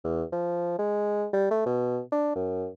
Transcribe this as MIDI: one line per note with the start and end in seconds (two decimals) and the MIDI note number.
0.04 0.23 40
0.32 0.77 53
0.79 1.26 56
1.33 1.48 55
1.51 1.64 57
1.66 2.00 47
2.12 2.33 62
2.35 2.68 42